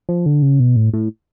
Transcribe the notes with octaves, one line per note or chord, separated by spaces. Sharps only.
F3
D3
C#3
B2
A2
A2